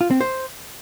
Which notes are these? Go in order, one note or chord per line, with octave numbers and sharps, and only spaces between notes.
F4
C4
C5